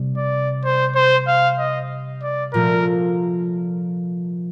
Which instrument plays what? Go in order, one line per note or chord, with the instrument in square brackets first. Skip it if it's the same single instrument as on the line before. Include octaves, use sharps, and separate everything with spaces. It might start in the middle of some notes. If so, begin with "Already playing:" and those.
Already playing: [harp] C3 G3
[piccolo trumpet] D5
C5
C5
F5
D#5
D5
[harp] A#2 F3 A3 [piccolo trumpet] A#4